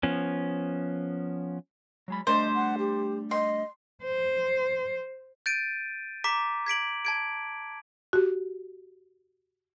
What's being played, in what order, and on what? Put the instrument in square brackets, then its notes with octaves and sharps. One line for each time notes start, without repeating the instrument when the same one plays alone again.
[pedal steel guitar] F3 B3 C#4
[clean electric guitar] F#3 G#3 B5
[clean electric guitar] G3 A3 D4 [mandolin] C5 [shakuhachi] D#5
[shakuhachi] F#5
G4
[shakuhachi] D#5 [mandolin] C6
[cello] C5
[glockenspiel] G6 A6 D7 D#7
A#5 D6 B6
G#6 B6 D7 F#7
A5 G#6 D7
[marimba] F#4 G4